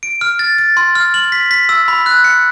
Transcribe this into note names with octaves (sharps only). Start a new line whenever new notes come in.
D7
F6
A6
A6
C6
F6
F#7
B6
B6
E6
B5
F#6
C#7